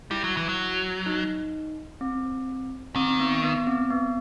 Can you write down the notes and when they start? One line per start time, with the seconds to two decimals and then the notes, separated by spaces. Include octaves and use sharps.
0.11 G3 E4
0.24 F#3
0.37 E3
0.49 F#3
1.06 D#4
2.01 C4
2.95 D#3 C4
3.20 B3
3.43 B3
3.67 C4
3.90 B3